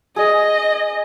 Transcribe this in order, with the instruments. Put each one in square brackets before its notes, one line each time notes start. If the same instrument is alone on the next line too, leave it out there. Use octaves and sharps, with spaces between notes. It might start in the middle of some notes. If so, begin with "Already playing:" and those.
[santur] G#4 [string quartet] D#5